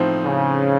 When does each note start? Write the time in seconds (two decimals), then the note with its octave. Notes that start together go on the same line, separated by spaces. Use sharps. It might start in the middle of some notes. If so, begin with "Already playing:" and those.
Already playing: A2 F3 C4 D#4
0.24 C#3